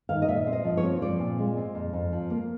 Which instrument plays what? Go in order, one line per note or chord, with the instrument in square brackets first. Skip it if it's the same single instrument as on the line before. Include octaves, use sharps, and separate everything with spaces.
[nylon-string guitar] D#3 F5
D#5
A#2 E5
C4
D#5
F3
C#5
C4
F3 D5
A#2
G#3
C4
F2
F2
F3
A#3